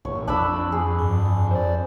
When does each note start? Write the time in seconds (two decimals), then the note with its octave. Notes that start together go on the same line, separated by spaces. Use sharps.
0.05 A#1 C#5
0.28 F2 D4 B5 E6
0.72 G#4
0.99 G2
1.51 C5 D5